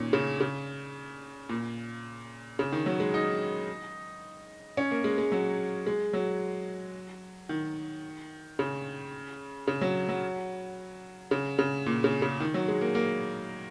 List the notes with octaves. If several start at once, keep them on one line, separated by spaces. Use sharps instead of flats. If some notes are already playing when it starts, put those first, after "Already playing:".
Already playing: A#2 D#3 C#4
C#3
C#3
A#2
C#3
D#3
F#3
G#3
D#4
C#4
A#3
G#3
G#3
F#3
G#3
F#3
D#3
C#3
C#3
F#3
F#3
C#3
C#3
A#2
C#3
C#3
D#3
F#3
G#3
A#3
A#3